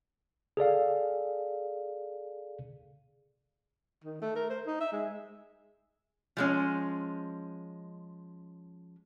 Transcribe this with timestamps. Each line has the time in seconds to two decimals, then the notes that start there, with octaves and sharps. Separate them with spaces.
0.57 G#4 A4 D5 F5
4.04 D#3
4.22 A3
4.36 A#4
4.50 C5
4.66 D#4
4.81 E5
4.92 G#3
6.37 F3 G#3 C#4